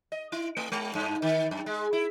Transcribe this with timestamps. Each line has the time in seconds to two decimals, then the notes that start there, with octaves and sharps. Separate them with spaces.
0.12 D#5
0.32 E4
0.57 A3
0.72 G#3
0.95 G2
1.22 D#3
1.51 F#2
1.66 G#3
1.93 E4